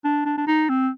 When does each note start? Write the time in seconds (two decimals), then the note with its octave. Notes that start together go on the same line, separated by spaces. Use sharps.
0.05 D4
0.26 D4
0.38 D4
0.47 D#4
0.69 C4